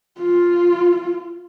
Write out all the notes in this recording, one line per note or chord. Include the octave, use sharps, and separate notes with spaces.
F4